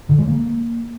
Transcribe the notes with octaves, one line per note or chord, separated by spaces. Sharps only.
D3
G#3
A#3